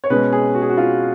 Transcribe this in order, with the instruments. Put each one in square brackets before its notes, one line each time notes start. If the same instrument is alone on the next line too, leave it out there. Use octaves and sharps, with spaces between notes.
[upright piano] C#5
B2 G#3 C#4 B4
G#4
F#4
G#4
F#4
F4